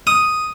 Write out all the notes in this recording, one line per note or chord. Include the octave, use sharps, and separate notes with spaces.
D#6